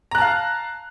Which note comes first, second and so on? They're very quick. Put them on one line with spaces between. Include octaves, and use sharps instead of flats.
A#5 F#6 A5 F5